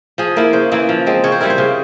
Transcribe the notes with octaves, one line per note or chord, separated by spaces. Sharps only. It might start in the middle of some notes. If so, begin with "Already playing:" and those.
F3 G#4
A#3 E4 A#4
C#3 C5
E3 A#3 E4
F3
G#3 C4
C#3 C#5
C5
G3 C4 E4 A#4
C5
C#3